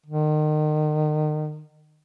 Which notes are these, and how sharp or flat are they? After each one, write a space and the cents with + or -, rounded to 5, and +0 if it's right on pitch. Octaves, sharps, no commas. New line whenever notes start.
D#3 -35